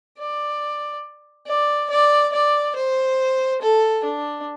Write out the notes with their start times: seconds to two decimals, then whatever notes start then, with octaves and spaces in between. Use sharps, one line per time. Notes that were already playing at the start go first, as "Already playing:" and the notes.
0.18 D5
1.47 D5
1.90 D5
2.33 D5
2.76 C5
3.61 A4
4.04 D4